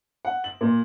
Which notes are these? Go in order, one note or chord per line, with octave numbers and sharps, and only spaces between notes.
F#5
F#7
A#2